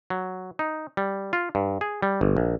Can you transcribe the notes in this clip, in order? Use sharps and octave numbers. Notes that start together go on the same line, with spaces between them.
F#3
D#4
G3
F4
G2
G#4
G3
G1
A#1